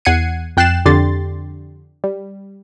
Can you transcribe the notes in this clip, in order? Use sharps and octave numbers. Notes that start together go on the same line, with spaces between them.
E2 F#5 G#6 C7 C#7 D#7
F2 G5 F#6 A6 C7 E7
F2 D3 G4 C6 A6
G3